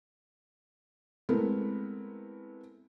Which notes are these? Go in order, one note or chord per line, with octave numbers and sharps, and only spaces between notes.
G#3 A3 B3 C4 E4 A#4